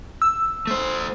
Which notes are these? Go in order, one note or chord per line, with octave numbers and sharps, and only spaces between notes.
E6
A3 C5